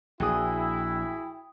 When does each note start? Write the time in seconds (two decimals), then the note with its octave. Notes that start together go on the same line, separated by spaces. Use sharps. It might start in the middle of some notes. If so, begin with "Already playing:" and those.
0.20 A#1 E4 F#4 G#4 G5 D#6